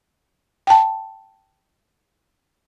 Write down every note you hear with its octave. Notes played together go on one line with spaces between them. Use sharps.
G5 A5